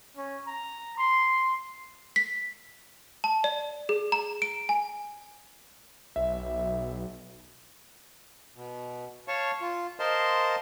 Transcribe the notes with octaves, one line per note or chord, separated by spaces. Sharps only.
C#4
A#5
C6
B6
A5
D5
G#4
A#5
D7
G#5
B1 E5
B2
C#5 F5 A5 C#6
F4
A#4 C5 D#5 F5 A5 C6